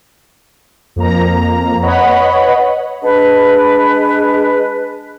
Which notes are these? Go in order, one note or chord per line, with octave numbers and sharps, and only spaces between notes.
F2 A#3 A#5
B4 C#5 D#5 F#5 B5
G#3 D4 B4